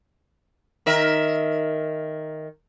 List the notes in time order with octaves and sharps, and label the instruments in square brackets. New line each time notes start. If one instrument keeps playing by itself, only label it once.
[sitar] D#3 A#4 E5